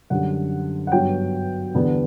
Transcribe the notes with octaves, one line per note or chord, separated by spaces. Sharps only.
F#2 D3 G3 F#5
F#5
G2 F#3 B3 G5
E2 D3 G3 B3 D4